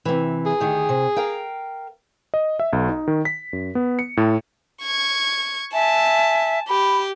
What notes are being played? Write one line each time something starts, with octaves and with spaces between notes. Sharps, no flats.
C3 E3
G#4
D2 D#3 G4
C3
A#4 F5 G5
D#5
E5
B1
D#4
D#3
B6
F#2
B3
C#7
A2
C#6 G#6
E5 G#5 A5
G4 B5